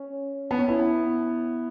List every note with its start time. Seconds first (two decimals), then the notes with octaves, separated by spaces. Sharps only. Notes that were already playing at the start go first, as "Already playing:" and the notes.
Already playing: C#4
0.51 B3
0.58 C#4
0.68 B3 E4